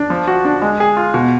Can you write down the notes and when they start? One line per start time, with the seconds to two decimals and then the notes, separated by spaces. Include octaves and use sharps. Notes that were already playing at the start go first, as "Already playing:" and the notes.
Already playing: D4
0.10 F3
0.28 F#4
0.45 D4
0.62 G#3
0.80 G#4
0.97 F4
1.14 B2